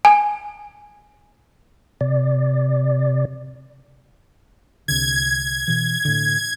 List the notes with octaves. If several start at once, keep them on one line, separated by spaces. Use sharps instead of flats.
G#5
C3 D5
C2 D3 G#6
B2 E3
A2 D3